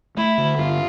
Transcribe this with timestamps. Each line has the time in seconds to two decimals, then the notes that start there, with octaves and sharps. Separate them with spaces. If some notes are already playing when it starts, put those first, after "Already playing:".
0.17 A3 E4
0.38 D3
0.58 G2 F4